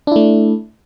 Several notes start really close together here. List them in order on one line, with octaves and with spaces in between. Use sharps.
D4 E4 A3